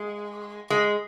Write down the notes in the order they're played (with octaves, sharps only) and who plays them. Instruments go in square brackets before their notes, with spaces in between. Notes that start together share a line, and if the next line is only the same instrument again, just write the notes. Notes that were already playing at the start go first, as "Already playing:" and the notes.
Already playing: [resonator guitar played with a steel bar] G#3
G#3